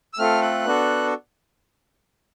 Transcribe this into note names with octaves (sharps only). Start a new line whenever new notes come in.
E6
A3 C4 F4 A4 F6
F#6
B3 D4 F#4 A4